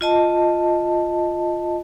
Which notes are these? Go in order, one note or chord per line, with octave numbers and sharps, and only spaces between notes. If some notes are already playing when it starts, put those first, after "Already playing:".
F4 D#5 A5